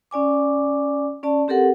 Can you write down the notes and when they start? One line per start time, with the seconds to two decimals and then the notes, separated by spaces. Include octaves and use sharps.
0.11 C#4 D5 G#5 D6
1.23 C#4 D5 A5
1.48 C4 G4 A4 A#4 F#5